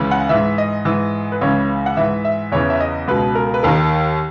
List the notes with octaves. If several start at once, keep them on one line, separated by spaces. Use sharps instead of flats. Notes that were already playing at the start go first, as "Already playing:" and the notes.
Already playing: C#2 C#3 E3
F#5
G#2 E3 E5
D#5
G#2 E3
B4
C#2 C#3 E3 C#5
F#5
G#2 E3 E5
E5
E2 C#3 E3 C#5
E5
D#5
C#2 B2 B4
A#4
B4
D#2 D#3 A#4